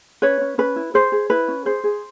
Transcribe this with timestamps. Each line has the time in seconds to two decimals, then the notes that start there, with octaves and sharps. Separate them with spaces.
0.22 C#4 B4 C#5
0.41 C#4
0.58 C#4 B4
0.76 E4
0.94 G#4 C5
1.12 G#4
1.30 E4 B4
1.48 C#4
1.65 G#4 C5
1.84 G#4